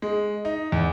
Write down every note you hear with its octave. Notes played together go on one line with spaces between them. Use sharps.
G#3
D#4
E2